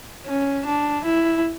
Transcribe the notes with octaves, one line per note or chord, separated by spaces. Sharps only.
C#4
D4
E4